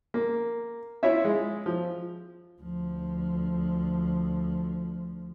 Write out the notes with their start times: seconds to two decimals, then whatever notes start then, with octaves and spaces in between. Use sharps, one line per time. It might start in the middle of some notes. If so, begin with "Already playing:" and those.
0.14 A#3
1.03 E4 F4 C#5 E5
1.25 G#3
1.66 F3
2.62 D2 F3